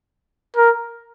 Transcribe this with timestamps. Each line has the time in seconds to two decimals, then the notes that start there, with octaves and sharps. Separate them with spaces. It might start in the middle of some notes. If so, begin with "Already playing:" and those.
0.56 A#4